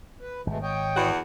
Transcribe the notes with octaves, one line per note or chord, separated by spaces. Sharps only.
B4
G#1 B2 G#3 A3
C#5 D#5 G5
E2 F#4